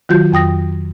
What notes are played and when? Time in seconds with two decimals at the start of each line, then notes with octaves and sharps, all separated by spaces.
0.09 D#3 F#3 F4 F#4 G6
0.32 F2 G5 D#6 A#6